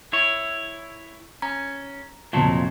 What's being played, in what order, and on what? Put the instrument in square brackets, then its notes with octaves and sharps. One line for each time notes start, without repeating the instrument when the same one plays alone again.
[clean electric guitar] E4 C#5
[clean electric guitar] C#4 [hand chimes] A#5
[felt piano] F1 A5 [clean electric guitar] A#2 F3 F#3